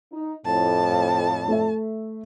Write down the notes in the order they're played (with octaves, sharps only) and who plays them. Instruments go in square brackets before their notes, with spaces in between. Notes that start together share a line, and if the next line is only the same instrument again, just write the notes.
[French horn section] D#4
[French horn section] F2 A2 [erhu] A5
[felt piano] F5
A3 A4 E5